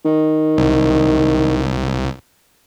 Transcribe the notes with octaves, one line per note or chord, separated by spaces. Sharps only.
D#3
C2